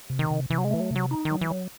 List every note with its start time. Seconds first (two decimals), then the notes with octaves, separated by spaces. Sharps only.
0.10 C3
0.19 D#3
0.30 C3
0.50 C3 E3
0.58 F#3
0.65 G#3
0.71 E3 A3
0.80 F#3
0.91 C3 F#3
1.11 D#4
1.25 D#3
1.31 F#3
1.41 E3
1.51 F#3